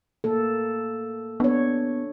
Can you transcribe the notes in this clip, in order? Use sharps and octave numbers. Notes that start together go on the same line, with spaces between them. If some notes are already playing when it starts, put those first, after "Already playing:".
A#3 A4
B3 D4 C#5